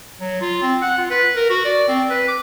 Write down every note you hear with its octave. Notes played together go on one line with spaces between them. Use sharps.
F#3
F4
C4
F#5
F4
B4
A#4
F#4
D5
C4
B4
D6